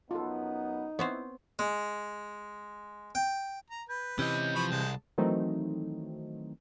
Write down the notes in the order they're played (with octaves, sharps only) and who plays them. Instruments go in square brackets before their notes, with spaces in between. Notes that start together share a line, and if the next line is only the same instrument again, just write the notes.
[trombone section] F#2 B3 [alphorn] D#4 [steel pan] F4 A4
[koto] B3 C4 C5 [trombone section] E4 [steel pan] C#5
[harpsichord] G#3
G5
[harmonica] A#5
[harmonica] B4 [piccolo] G6
[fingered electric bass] C3 E3 [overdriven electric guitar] C#4 D#5 [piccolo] G6
[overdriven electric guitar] F3 [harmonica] B5 C#6
[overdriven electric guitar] C2 [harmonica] G#3 A5
[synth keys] D#3 E3 F#3 A3 C4 D#4